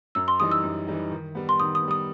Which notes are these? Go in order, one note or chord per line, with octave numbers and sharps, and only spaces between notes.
F#2 E6
C6
E3 G3 D#4 D#6
E6
F#2
E3 G3 D#4
D#3
G3 B3
C6
D#3 D#6
D#6
B3
G3 D#6